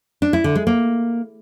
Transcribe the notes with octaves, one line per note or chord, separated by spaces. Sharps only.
D4
E4
D3
G#3
A#3